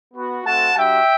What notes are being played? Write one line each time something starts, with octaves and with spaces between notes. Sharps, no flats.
B3 F#4
A3 C4 F#4 F#5 A5
G3 D4 F#4 E5 G5